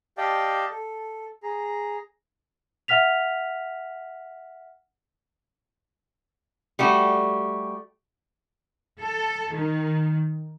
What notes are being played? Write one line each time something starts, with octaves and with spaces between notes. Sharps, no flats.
G4 D5 D#5 F5 G5 A5
A4
G#4 A#5
E5 F#5 F6 B6 F7
G3 A3 F#4
A4
D#3